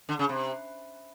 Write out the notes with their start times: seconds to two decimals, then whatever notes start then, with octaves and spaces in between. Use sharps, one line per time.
0.09 D3
0.19 C#3
0.29 C3